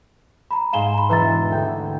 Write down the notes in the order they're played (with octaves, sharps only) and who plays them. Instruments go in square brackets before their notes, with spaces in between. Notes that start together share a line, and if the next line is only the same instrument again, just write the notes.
[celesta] A#5 B5
[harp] G#2 G#5 C6 [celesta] F5 E7 G7
[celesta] A#5 B5
[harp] E1 E3 E5 [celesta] B4 A#5 A6
[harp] D2 G5 G6